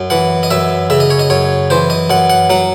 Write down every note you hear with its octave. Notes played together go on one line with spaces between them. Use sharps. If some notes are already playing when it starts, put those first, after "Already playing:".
Already playing: F#2
E3 F#5
D#5
F#2 E5
C#3 E5
D#5
C#5
D#5
F#2 C#5
E3 C5
D#5
F#2 F#5
F#5
F#3 F#5